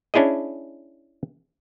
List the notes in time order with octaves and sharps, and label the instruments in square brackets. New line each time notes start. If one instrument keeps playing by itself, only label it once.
[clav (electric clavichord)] C#4 D4 E4 G#4 D#5